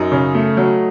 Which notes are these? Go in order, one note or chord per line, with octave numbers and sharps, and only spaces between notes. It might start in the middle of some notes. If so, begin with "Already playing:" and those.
Already playing: F#2 D#4
C#3
A3
F#3